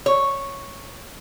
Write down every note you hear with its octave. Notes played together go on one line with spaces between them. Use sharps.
C#5